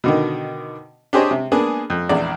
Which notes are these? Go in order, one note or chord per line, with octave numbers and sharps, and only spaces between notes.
B2 D3 D#3
D4 G4 G#4 C5 C#5 D#5
C3
A#3 B3 D4 G#4
F2
A#1 E2 D5